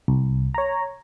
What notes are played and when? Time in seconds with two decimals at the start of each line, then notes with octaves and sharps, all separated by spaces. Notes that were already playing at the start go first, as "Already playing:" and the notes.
0.08 C2
0.54 C#5 A#5